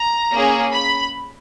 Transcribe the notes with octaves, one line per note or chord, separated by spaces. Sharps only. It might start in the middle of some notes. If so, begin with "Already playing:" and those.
Already playing: A#5
A#3 C#4 G#4
B5